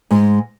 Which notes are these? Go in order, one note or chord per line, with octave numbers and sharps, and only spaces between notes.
G#2 G#3